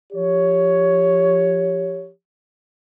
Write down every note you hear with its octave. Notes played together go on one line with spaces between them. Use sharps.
F3 G4 C#5